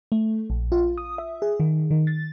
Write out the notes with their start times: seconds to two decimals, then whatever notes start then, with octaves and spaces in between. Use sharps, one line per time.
0.12 A3
0.50 A#1
0.72 F4
0.98 D#6
1.18 E5
1.42 G#4
1.60 D#3
1.91 D#3
2.07 A6